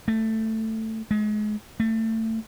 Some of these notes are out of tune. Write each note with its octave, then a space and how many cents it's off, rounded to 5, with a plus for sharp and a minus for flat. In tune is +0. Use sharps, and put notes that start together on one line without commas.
A3 +10
G#3 +30
A3 +25